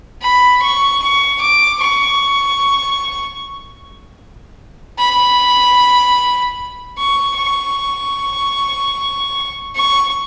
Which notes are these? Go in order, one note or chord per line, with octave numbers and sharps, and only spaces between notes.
B5
C#6
C#6
D6
C#6
B5
C#6
C#6
C#6